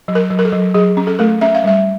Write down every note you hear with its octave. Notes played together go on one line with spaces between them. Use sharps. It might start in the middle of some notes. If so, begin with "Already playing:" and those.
F#3
A#4
F#3
A#4
A4
F#3
F#3 G#4
C#4
A4
A3 A#4
C#4 E5
F5
G3 E5